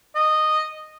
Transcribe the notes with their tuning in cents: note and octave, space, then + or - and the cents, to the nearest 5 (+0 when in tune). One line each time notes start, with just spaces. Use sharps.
D#5 -10